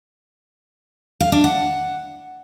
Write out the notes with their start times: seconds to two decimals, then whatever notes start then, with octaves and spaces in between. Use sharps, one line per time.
1.20 F5
1.32 D4
1.44 F#5